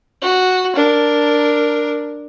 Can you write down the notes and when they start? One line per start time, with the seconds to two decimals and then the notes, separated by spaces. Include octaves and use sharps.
0.22 F#4
0.75 D4 A#4